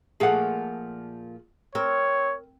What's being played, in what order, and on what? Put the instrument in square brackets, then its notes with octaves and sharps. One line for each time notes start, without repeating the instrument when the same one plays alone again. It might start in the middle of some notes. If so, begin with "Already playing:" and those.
[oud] A#2 F3 A3 [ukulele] G#4 F#5
[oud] C4 [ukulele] A#4 [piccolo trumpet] C#5